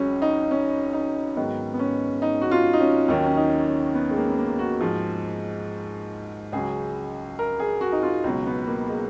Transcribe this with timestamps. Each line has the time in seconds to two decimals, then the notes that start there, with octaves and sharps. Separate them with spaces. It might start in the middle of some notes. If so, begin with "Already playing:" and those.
Already playing: C#2 C#3 F#3 C#4
0.22 D#4
0.51 C#4
0.93 D#4
1.36 G#2 D#3 F#3 B3
1.73 B3
1.79 C#4
2.22 D#4
2.41 F#4
2.51 F4
2.73 D#4
2.80 C#4
3.08 D#2 D#3 F#3 C#4
3.26 C#4
3.37 D#4
3.66 C#4
3.95 B3
4.11 G#3
4.17 A#3
4.29 B3
4.38 A#3
4.59 F#4
4.81 G#2 F3
6.52 C#2 C#3 F#3 G#4
7.39 A#4
7.60 G#4
7.81 F#4
7.92 D#4
8.03 F4
8.24 C#2 B2 F#3
8.46 B3
8.67 A#3
8.89 G#3